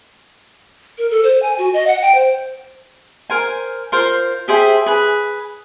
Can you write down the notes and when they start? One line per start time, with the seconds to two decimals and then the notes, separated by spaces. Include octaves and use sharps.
0.98 A#4
1.11 A4
1.24 C5
1.42 G#5
1.59 F#4
1.74 D#5
1.87 F#5
2.01 G5
2.15 C5
3.30 A#4 C5 G#5
3.92 F4 A#4 C5
4.48 G4 G#4 C5 E5
4.86 G#4 B4